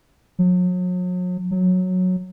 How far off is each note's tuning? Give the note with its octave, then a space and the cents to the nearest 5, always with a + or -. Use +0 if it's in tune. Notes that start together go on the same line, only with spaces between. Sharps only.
F#3 -40
F#3 -10